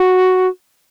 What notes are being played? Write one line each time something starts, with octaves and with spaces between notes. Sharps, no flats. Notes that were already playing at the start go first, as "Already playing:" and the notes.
Already playing: F#4